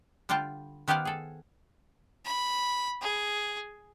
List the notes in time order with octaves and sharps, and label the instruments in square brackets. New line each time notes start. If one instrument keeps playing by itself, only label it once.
[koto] D3 G3 F4 G5 A5
D#3 B3 G4 C5 F5 F#5
G#4 A4
[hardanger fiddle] B5
G#4